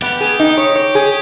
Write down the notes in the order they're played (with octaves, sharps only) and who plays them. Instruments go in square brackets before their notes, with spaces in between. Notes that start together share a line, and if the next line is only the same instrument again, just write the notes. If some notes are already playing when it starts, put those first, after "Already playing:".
[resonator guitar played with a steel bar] B3 [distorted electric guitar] G4
[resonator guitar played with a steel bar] G#4
D#4
C#5
C#5
G#4